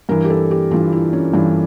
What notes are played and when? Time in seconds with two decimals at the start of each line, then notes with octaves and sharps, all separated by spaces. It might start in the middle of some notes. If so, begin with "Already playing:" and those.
0.09 G2 E3 A#4
0.25 G4
0.30 A4
0.51 G4
0.71 G2 E3 F4
0.92 E4
1.13 C#4
1.34 G2 E3 D4